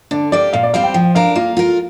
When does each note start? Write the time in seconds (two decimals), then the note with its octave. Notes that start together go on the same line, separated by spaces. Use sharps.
0.11 D3 D4
0.32 A#3 G4 D5
0.53 A#2 F5
0.63 D5
0.74 G3 C4 G4 F5
0.84 G5
0.94 F3 G5
1.15 D4 A#4 F5
1.35 A#3 F4
1.57 F4 A#4